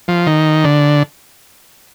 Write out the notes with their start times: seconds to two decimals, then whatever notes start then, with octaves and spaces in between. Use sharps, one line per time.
0.08 F3
0.27 D#3
0.64 D3